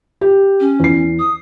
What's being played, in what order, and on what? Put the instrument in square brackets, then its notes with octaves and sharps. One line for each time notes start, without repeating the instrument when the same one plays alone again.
[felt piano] G4
[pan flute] C#4
[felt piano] E2 C7
[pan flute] D#6